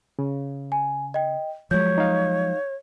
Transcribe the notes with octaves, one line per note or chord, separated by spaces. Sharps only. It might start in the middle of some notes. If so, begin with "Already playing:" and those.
C#3
G#5
D#5 G5
F3 F#3 G#3 C#5 G6
D#4 F5